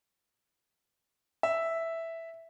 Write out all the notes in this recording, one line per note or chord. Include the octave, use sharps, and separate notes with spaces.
E5